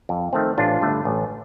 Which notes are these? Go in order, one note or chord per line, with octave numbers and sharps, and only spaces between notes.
F2
D#3 A3 C4
A1 D4 F4
G2 D3 A3
A1